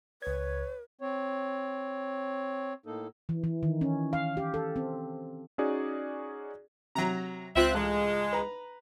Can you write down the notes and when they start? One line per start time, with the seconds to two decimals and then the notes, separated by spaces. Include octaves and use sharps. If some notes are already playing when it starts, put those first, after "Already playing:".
0.22 C#2 B4 C#5 G#6
1.01 C4 C#5
2.86 A2 A#3 D#4 A4
3.29 E3
3.44 E3
3.63 D#3
3.81 C#4
4.13 F5
4.37 G4
4.54 A4
4.76 C4
5.58 C#4 D#4 F#4 G#4 D5
6.95 C3 F#3 A#5
7.56 C#2 C4 F4 E5 F#6
7.74 A1 G#3
8.33 B4 A#5